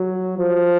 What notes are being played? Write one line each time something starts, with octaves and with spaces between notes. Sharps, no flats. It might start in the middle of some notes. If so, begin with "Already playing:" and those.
Already playing: F#3
F3